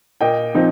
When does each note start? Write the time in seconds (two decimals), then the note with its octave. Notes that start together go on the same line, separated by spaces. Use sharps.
0.21 A#2 D#5 G5
0.55 F3 C4 D#4